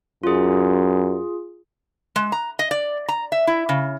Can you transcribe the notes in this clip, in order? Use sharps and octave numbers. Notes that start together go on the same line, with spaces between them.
F#2 F4 G#4
G#3
A#5
D#5
D5
A#5
E5
E4
C#3